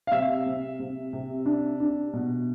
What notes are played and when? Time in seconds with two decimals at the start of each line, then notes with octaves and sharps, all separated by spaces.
0.07 F5
0.12 C3 E5
0.46 C3
0.79 C3
1.13 C3
1.46 D4
1.80 D4
2.13 B2